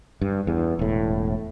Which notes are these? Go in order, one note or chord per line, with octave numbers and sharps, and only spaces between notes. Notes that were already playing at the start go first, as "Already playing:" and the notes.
G2
E2
E1 A2